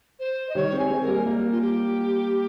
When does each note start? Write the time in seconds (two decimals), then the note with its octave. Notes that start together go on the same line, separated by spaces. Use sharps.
0.20 C5
0.49 D#5
0.55 D#3 G3 C#5
0.73 G#3 C4
0.79 G#5
0.91 G#3 C4
1.02 A#4
1.08 G3 A#3
1.26 G3 A#3
1.52 F4
1.61 G4